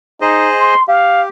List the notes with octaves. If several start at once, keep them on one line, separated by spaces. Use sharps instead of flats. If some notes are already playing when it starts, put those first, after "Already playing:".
D#4 G#4 C5 D#5
C6
G4 F5